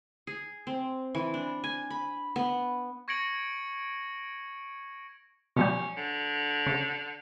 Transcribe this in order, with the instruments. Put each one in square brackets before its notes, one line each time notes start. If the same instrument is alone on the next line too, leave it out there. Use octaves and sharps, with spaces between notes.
[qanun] G#4
C4
E3
D4
G#5
B5
B3
[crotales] C#6 G#6 A#6 C#7 D7 F#7
[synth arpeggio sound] B2 F3 G3 [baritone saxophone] C#4
[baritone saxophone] D3
[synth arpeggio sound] C#3